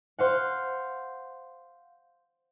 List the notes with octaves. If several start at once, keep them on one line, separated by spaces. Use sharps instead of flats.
C5 F5 F#5